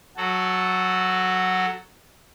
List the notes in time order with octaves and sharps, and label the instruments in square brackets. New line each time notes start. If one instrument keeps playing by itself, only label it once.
[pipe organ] F#3 F#4 A4